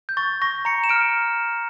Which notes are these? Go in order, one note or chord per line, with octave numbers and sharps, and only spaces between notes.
G6
C#6 A6
C#6 A#6
A#5 C#7
E7
F6 D7